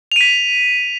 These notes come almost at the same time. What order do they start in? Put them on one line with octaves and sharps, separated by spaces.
F7 D#7 B6